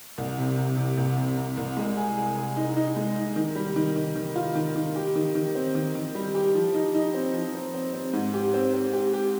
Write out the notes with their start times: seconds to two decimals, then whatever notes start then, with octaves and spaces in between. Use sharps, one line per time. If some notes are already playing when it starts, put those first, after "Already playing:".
0.18 C2
0.38 C3
0.57 C3
0.77 C3
0.97 C2
1.17 C3
1.37 C3
1.57 C2
1.77 G#3
1.97 G#4
2.17 G#4
2.36 G#4
2.57 D#4
2.77 D#4
2.96 G#3
3.16 D#4
3.36 D#3
3.55 G3
3.76 D#3
3.96 D#3
4.15 D#3
4.36 F4
4.55 D#3
4.76 D#3
4.96 G4
5.15 D#3
5.35 D#3
5.55 C4
5.75 D#3
5.95 D#3
6.15 G3
6.35 G4
6.55 F3
6.74 D#4
6.94 D#4
7.14 C4
7.34 F3
7.55 C4
7.74 C4
7.94 C4
8.13 G#2
8.34 G4
8.54 C4
8.74 C4
8.93 G4
9.14 G4